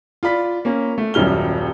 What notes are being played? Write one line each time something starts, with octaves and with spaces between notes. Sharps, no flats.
F4 D5 B5 B6
A#3 C#4
A3
D#1 F#2 G3 F6 G7